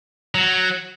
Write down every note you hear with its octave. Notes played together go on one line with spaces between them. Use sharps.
F#3